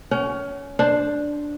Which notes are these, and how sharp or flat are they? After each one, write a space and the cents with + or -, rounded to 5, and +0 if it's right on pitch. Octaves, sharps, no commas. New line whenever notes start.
C#4 +20 G5 -45
D4 +0 C5 +0